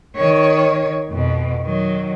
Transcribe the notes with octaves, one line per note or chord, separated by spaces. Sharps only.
D#3 C#5
F2 B2
D#3 F#3